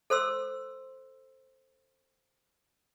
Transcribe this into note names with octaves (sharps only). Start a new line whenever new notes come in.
A4 C5 C6 E6